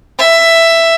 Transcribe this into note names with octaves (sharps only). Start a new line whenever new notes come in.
E5